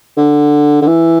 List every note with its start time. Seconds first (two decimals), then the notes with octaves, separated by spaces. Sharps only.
0.17 D3
0.82 D3
0.87 E3